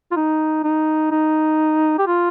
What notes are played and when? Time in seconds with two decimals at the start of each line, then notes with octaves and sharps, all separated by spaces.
0.12 F4
0.16 D#4
0.64 D#4
1.11 D#4
1.98 G4
2.07 F4